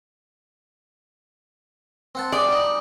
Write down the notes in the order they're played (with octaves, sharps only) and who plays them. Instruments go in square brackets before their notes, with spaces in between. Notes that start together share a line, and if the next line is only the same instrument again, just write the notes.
[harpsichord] C4 F#5 A5
[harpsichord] G#4 F#5 G5 [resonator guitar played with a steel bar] D5
[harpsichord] G3 D#4